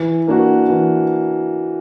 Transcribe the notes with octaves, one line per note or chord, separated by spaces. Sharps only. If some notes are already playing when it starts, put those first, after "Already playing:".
Already playing: E3
A#3 D4 F#4
E3